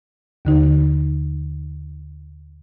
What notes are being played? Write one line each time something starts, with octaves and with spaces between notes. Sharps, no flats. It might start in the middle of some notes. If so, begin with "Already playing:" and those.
D#2 D3 D#4